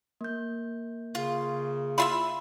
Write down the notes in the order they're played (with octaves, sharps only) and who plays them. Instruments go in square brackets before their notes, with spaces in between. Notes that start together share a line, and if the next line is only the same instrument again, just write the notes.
[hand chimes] A#3 G6
[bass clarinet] C#3 [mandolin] F4
[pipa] E4 F4 E5 [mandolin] B5 C6 E6